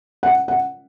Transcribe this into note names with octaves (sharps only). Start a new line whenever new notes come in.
F#5
F#5